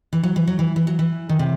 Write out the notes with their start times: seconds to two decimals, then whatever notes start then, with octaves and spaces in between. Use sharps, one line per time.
0.13 E3
0.23 F#3
0.36 E3
0.47 F#3
0.59 E3
0.76 E3
0.87 F#3
0.99 E3
1.29 D#3
1.39 C3